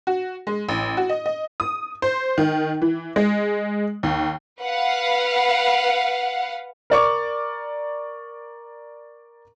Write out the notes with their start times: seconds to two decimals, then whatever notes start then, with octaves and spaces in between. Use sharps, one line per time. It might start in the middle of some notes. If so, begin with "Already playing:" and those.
0.07 F#4
0.47 G#3
0.69 A1
0.97 F#4
1.09 D#5
1.26 D#5
1.60 D#6
2.02 C5
2.38 D#3
2.82 E3
3.16 G#3
4.03 D#2
4.62 B4 F5 F#5
6.90 A#4 D5 C#6 D6